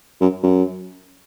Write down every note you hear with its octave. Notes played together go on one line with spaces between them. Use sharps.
F#2
F#2